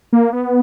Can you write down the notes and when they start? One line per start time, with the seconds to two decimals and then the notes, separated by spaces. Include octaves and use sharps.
0.13 A#3
0.33 B3